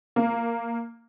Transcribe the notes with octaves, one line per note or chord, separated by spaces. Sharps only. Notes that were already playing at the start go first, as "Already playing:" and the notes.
A#3